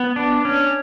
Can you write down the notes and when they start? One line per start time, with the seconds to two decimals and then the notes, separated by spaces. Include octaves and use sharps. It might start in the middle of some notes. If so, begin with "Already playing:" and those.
Already playing: B3
0.16 D4
0.45 C#4